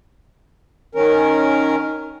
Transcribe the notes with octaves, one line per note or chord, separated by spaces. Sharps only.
D#3 C#4 A#4